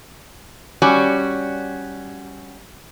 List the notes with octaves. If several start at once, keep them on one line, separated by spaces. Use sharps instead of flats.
G3 C#4 F#4